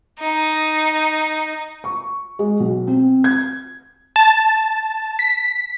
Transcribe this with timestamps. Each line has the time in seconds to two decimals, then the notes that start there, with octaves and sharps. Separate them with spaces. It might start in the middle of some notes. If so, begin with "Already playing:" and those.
0.20 D#4
1.84 C#6
2.39 G#3
2.60 B1
2.87 C4
3.24 G#6
4.16 A5
5.19 B6